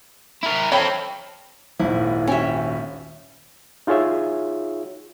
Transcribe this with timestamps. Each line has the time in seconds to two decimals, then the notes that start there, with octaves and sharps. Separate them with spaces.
0.43 E4 A#4
0.72 C4 A4 C#5 G5 B5
1.80 D#1 G#1 E4
2.27 C#4 F#4 E5 G5 G#5
3.87 D#4 F4 F#4 G#4 C#5 E5